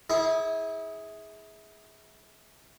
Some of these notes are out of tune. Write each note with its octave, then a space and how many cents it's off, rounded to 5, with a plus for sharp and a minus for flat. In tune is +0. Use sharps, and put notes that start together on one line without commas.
E4 -30 G#4 +0